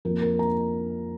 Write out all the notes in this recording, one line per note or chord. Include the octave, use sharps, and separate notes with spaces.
F2 F3 A#3 A#4
A#4
A#5